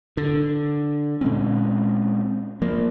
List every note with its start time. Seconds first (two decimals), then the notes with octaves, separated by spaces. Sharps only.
0.17 D3
1.21 A#2 G#3 C4 C#4
2.62 F3 A#3